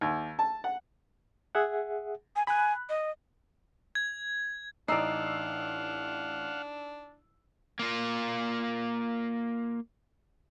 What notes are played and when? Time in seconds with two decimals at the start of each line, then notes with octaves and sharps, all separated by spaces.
0.01 D#2
0.39 A5
0.64 F#5
1.55 G#4 E5 F#5
2.36 G#5
2.47 G#5 B5 F#6
2.89 D#5
3.95 G#6
4.88 A1 D4 D#4 D5 F5 F#5 E6 C7
7.79 A#3 F4